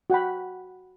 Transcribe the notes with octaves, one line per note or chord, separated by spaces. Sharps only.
F#4 F#5 G5 B5